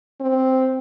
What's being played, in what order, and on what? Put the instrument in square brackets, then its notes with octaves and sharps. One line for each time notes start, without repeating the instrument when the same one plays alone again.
[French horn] C4